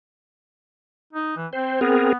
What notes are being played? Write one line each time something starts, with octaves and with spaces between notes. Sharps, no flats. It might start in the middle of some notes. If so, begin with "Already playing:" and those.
D#4
E3
C4 C5
B3 C4 G#4 A#4